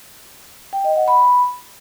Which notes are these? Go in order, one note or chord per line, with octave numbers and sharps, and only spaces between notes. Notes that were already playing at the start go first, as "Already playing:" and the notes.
G5
D#5
F#5
B5